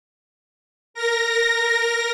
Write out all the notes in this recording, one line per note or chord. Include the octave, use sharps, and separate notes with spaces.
A#4 A#6